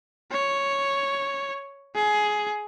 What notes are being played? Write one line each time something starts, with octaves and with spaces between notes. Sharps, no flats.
C#5
G#4